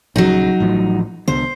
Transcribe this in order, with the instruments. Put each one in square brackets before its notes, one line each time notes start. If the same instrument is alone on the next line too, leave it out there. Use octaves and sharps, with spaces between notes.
[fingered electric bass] A#1 C#3 [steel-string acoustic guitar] F#3 D#4
[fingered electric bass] A1 A2 F3
[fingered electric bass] C2 D3 B3 [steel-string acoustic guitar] C5